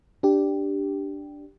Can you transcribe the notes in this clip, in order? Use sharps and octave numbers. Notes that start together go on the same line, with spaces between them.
D4 G4